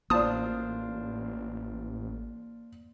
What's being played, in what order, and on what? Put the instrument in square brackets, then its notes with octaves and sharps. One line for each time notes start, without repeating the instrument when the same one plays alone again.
[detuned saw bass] A1 [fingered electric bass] A#3 [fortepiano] D4 F4 C5 [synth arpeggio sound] A5 D#6